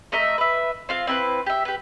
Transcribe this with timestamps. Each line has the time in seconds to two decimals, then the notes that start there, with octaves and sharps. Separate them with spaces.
0.12 A3 A#4 D#5 E5
0.38 B4 E5
0.89 C4 F4 F5
1.07 C4 E4 A4 B4
1.46 G4 E5
1.65 G4 B4